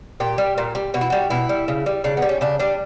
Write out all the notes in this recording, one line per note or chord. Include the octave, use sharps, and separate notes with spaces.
A#2 G4
G3
A#2
G3
B2 F#4
E4
G3 F#4
B2 E4
G3
C#3
G3
C#3 D4
B3
G3
C#4
C#3 D4
G3 D4